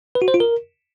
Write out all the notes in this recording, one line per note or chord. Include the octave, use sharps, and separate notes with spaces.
B4
F#4
C5
F4
A#4